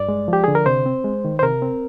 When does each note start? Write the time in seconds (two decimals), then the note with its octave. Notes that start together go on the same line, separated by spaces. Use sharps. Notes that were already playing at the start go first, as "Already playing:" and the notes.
Already playing: G2 D5
0.08 G#3
0.28 F3
0.33 G4
0.44 D3 G#4
0.55 A#4
0.66 C3 C5
0.86 C4
1.04 G#3
1.25 D#3
1.39 C5
1.43 C3 A#4
1.62 C4